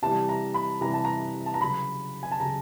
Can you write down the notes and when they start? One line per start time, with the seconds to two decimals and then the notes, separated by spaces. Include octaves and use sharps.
0.02 C3 E3 G3 A5
0.29 A#5
0.54 B5
0.81 C3 E3 G3 A#5
0.94 A5
1.05 A#5
1.46 A5
1.54 A#5
1.61 C#3 F#3 B5
2.23 G#5
2.32 A5
2.40 C#3 F#3 A#5